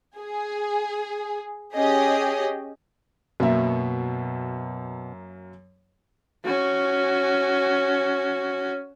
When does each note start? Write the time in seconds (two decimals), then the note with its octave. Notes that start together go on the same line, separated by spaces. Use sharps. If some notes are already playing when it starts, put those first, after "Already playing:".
0.18 G#4
1.74 C#4 G4 G#4 D#5
3.40 F#2 B2 A#3 E5
6.45 C#4 F#4